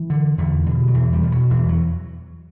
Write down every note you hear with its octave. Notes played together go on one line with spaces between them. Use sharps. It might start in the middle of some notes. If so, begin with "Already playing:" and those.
Already playing: E3
D3
E2 D3
B2
F#3
E2 E3
G3
B2
F#3
E2 E3
F#3